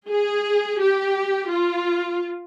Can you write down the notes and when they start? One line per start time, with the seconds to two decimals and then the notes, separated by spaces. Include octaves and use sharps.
0.10 G#4
0.80 G4
1.50 F4